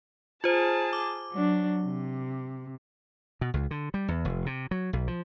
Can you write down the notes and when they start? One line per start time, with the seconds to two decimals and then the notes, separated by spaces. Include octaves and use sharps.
0.44 F4 G#4 C5 A5
0.93 D6
1.32 F#3 D4
1.83 C3
3.41 B2
3.54 C#2
3.71 D3
3.94 G3
4.08 E2
4.25 F1
4.46 C3
4.71 F#3
4.93 B1
5.08 F3